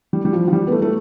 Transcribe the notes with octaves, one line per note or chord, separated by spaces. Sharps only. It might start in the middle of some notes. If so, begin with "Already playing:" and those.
G3
G3
F3
F3
G3
B3
A3
A3